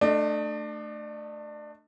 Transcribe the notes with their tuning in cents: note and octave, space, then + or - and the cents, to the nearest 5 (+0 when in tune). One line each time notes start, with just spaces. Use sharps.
A3 +0 D4 +25 D#5 +0